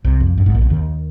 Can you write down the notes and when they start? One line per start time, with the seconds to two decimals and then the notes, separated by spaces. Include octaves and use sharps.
0.04 C2 C3
0.20 F2
0.38 F#2
0.46 G#1 G#2
0.55 A#1 A#2
0.62 C2 C3
0.70 D#2 D#3